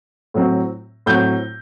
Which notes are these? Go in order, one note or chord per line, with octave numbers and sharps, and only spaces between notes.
A2 F#3 C4
A2 F#3 C4 G6